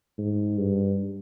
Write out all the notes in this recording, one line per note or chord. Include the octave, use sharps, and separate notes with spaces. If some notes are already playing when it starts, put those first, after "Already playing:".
G#2
G2